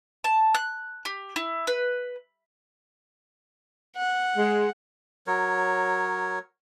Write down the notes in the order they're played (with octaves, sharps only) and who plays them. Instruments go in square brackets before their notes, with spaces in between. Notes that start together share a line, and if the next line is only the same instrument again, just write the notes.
[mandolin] A5
F#6
G4
E4
B4
[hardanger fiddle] F#5
[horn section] G#3
[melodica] F#3 A#4 C#5